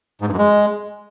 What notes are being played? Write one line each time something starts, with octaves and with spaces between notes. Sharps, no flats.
G#2
G2
F#2
G#3